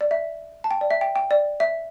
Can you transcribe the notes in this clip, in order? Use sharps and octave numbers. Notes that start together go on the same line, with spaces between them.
D5
E5
A5
G5
D5
E5
G5
G5
D5
E5